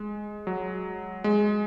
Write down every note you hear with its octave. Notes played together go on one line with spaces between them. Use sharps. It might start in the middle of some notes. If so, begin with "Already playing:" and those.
Already playing: G#3
F#3
G#3